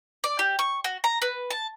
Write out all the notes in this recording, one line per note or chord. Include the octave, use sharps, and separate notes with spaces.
D5
G4
C#6
F#4
A#5
B4
A5